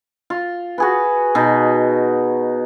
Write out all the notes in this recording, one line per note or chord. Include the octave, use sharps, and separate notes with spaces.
F4
F#4 G#4 B4
B2 D#4